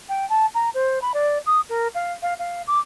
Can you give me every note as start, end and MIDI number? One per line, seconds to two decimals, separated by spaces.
0.09 0.28 79
0.29 0.46 81
0.54 0.69 82
0.74 0.99 72
1.01 1.12 83
1.14 1.38 74
1.46 1.60 87
1.69 1.88 70
1.94 2.12 77
2.22 2.34 77
2.39 2.62 77
2.67 2.78 86